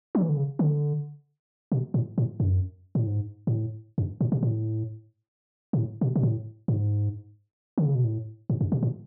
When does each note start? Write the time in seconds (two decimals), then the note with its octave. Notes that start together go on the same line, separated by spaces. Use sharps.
0.15 F#3
0.22 E3
0.29 D3
0.37 C#3
0.59 D3
1.72 B2
1.94 A2
2.18 A2
2.40 F#2
2.95 A2
3.07 G#2
3.47 G#2
3.52 A2
3.98 F#2
4.21 A2
4.32 B2
4.43 A2
5.73 B2
5.78 A2
6.01 B2
6.16 B2
6.23 A2
6.68 G#2
7.78 D3
7.86 C#3
7.95 B2
8.04 A2
8.50 G#2
8.61 F#2
8.72 B2
8.83 A2